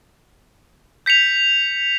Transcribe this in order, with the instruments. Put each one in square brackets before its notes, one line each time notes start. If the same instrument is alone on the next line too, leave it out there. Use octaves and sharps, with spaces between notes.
[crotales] G6 B6 C#7 F7